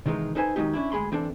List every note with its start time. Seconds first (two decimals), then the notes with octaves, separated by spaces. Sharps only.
0.06 C3 D#3 E3 G#3 D#4 F4
0.35 D#4 A4 B4 C5 G5 G#5
0.56 D#3 E3 F#3 G#3 D#4 G4
0.73 C#4 D4 E4
0.92 D2 G#3 G#4 B5 C6
1.12 E3 C4 D4 A4